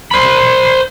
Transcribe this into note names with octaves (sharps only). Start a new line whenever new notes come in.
C5 B5